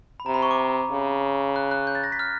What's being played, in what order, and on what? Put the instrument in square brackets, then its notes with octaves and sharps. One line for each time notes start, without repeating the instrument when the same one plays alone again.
[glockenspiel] B5
[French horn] C3 [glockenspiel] A#5
[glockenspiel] B5
C#6
D6
[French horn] C#3
[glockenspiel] F#6
F#6
G6
A6
A#6
B6
F6